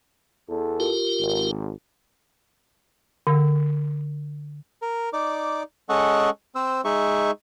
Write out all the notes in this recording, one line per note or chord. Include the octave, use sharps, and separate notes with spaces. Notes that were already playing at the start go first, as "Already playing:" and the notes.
E2 A4
F4 G4 A#4
G#1
D3
A#4
D#4 D5 D6
G#3 C#4 A4 D#5 F#5 C#6
C4 C5 E6
G#3 D#4 G#4 E5 C#6